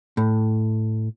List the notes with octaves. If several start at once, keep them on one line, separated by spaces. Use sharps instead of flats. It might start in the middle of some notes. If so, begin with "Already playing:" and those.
A2